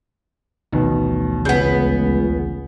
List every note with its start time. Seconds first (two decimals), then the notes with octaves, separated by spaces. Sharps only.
0.72 A1 D2 B2 D#3 F3
1.45 C#2 C#3 B3 G6